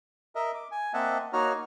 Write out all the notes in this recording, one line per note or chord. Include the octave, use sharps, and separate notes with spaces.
A#4 D#5 E5
D6
G#5
A#3 C4 D#5 E5 F#5 A5
A#3 D#4 F#4 C#5 A#5 F6